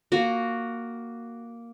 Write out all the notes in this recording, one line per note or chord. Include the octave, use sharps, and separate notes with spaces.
A#3 F#4